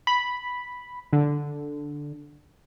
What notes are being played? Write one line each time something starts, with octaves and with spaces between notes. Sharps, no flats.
B5
D3